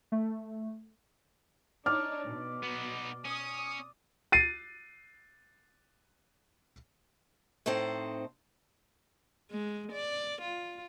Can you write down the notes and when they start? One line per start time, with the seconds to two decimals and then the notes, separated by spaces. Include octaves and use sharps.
0.12 A3
1.86 D4 D#4 C#5 D5 F6
2.27 B2
2.63 B3 D#4
3.25 C#4 D#6
4.32 A6 C7 D#7
7.66 A2 C4 D#4 A4 C5
9.51 G#3
9.92 D5
10.42 F4